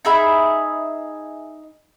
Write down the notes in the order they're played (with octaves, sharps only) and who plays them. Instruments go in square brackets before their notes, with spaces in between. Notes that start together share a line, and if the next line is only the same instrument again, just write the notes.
[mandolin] D#4 G#4 E5 B5